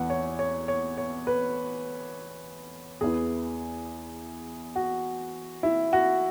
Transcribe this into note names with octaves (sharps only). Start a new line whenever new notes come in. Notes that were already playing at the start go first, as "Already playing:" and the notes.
Already playing: E2 E3 B3 F#5
C#5
C#5
C#5
C#5
B4
E2 E3 B3 G#4
F#4
E4
F#4